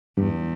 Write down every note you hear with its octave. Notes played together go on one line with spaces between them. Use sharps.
E2 G2